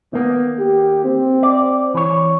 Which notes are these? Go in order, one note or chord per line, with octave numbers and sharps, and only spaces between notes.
D#3 A#3 B3
G4
C4
D5
E3 C#5